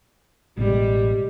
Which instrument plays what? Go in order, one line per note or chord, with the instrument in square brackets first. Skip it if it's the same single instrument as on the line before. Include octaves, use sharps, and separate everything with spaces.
[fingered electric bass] A1 B2 [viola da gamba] G3 G#3